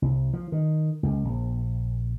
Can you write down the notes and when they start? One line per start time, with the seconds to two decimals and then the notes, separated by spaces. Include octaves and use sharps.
0.02 C2
0.33 F3
0.52 D#3
1.03 C#2
1.25 A#1